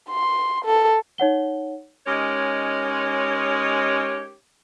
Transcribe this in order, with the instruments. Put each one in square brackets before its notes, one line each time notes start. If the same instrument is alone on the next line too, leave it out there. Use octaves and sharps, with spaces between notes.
[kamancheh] C6
A4
[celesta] D#4 C#5 F#5 G7
[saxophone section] G#3 C#4 D#4 G4 A#4 C#5